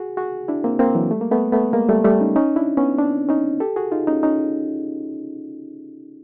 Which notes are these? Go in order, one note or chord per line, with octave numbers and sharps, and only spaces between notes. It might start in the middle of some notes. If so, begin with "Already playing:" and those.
Already playing: F#4 G#4
F#4 G#4
D4 E4
A#3 C4
A#3 C4
E3 F#3
G3 A3
A#3
A3 B3
A3 B3
G#3 A#3
G3 A3
G3 A3
C#4 D#4
C#4 D#4
D4 E4
B3 C#4
C4 D4
C#4 D#4
G4 A4
F#4 G#4
D#4 F4
C#4 D#4
C#4 D#4